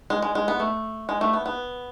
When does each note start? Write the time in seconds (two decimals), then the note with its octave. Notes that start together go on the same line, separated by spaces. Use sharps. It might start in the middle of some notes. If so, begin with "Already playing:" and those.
0.10 G#3
0.22 G#3
0.35 G#3
0.48 B3
0.59 A3
1.09 G#3
1.21 A3
1.33 B3
1.46 B3